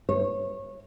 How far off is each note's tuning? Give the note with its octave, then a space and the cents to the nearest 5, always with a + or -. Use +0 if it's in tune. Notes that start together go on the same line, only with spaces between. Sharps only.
C#5 -20